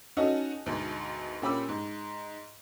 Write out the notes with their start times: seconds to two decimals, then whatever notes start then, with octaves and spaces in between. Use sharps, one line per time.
0.17 C#4 D#4 F#4 A4 D#5
0.66 D2 G#2 B2
1.42 A#2 C#4 G4 B5 D6 E6
1.69 G#2